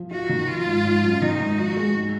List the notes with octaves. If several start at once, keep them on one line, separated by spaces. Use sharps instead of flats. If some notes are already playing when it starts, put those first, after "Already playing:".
Already playing: F3
F4 F#4
D#3
F3 F4
G#1
G#1
F#2
D#3 D#4
G#1
F3 F#4
G#3
G#2